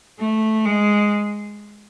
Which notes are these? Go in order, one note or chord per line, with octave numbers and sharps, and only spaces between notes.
A3
G#3